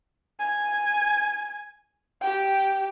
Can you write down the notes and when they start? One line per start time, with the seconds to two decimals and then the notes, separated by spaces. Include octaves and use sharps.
0.39 G#5
2.22 G4 G5